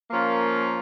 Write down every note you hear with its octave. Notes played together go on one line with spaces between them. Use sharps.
F3 A#3 C#4 F4 A#4